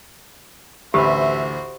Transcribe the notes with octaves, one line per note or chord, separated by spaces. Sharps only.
A1 D2 F#4 G4 B4 C5 E5